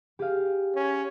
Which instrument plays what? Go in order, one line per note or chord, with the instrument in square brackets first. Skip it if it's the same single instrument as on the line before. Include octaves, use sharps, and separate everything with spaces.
[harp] G4 G#4 F5
[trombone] C#4